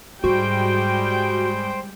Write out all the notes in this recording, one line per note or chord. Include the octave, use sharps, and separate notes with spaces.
G#2 G3 G#3 F#4 C5 G5